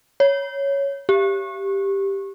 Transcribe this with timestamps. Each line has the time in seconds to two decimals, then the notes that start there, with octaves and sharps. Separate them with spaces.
0.20 C#5
1.09 G4